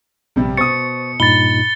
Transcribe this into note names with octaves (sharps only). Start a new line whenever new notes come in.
A#1 G2 C3 G3
B2 C5 C#6 D#6 A6 C#7
G2 A#2 D#4 B5 A6 G7